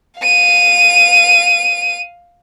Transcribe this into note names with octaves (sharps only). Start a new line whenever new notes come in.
F5 D#7